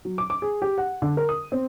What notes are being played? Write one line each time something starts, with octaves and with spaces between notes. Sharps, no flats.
F#3
D6
D6
G#4
G4
F#5
D3
A#4
D#6
C4